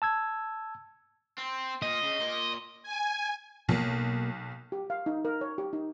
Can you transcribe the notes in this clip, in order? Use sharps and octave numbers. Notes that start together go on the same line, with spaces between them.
A5 E6 G#6
C4
A#2 D#5
C#3
A#2
G#5
B1 B2 A#3
G4
F5
D#4
A#4
C#5
G4
D#4